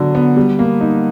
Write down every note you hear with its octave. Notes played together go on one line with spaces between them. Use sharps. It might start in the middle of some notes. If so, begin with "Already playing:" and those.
Already playing: D3 F#3 B3 D4
B3
G3
A#3
D#4